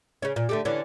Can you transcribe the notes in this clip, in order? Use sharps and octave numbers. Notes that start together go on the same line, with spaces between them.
C#3 C#4
A#2
D3 A3 G4
D3 E3 C#4